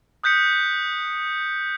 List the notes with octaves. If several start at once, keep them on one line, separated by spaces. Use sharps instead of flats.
D#6 F#6 G6 B6 C#7